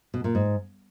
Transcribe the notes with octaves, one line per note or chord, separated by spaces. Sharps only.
B2
A#2
G#2